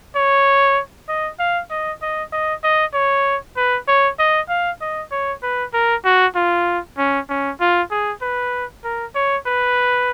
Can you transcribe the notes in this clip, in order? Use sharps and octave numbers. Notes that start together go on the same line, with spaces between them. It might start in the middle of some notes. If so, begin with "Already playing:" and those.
C#5
D#5
F5
D#5
D#5
D#5
D#5
C#5
B4
C#5
D#5
F5
D#5
C#5
B4
A#4
F#4
F4
C#4
C#4
F4
G#4
B4
A#4
C#5
B4